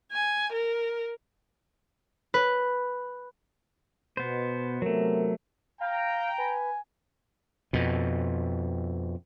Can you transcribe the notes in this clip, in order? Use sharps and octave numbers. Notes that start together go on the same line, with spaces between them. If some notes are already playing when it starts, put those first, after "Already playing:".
G#5
A#4
B4
B2 B3 C5
C3 F#3 A3 B3 A#4
F5 G5 A#5
B4 G#5
F2 B2